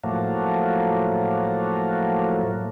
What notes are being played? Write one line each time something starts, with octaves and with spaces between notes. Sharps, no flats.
A2 F3 F#3 A3 A#3